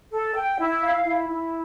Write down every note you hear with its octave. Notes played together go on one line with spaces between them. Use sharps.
A4
G5
E4
F5
E4
E4